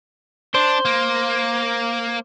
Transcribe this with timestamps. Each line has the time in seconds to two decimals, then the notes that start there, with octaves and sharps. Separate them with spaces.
0.55 D4 C5
0.85 A#3